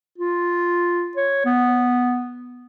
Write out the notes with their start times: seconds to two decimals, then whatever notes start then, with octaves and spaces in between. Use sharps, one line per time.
0.18 F4
1.17 C#5
1.45 B3